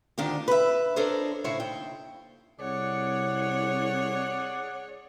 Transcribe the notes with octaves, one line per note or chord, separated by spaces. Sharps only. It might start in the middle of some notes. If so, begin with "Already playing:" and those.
D2 D#3 D4 F4 G4
B4 E5
D4 A4 A#4 C5 C#5 D#5
A2 C#3 C5 C#5 E5
D#2 G5
C2 G#4 C#5 D5 F#5